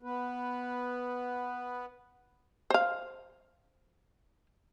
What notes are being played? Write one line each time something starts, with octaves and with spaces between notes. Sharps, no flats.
B3 B4
C5 F5